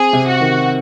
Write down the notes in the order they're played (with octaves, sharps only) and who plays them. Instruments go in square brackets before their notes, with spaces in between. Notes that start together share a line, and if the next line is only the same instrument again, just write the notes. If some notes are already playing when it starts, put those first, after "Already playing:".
Already playing: [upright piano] C4 [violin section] G#4
[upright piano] C3
[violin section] F#4
[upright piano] D#3